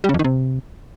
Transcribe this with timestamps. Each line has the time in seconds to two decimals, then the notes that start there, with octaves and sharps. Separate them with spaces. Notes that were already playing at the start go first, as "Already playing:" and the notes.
0.04 G3
0.09 C#3
0.14 F2
0.19 D#3
0.24 C3